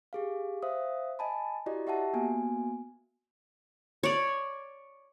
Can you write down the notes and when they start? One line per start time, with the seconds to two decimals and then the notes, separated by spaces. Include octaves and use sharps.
0.13 G4 G#4 F5
0.63 C5 E5 F5 D#6
1.19 D#5 G#5 A5 B5
1.66 E4 F#4 G4 D5 D#5
1.87 G4 E5 F#5 A5
2.13 A#3 B3 F#4 G#5
4.03 C#5 D5